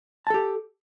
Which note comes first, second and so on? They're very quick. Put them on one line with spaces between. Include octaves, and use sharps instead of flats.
A5 A4 G4